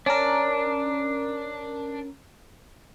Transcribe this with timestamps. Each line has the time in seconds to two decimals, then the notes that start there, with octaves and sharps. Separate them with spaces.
0.06 C#4 D4 A#4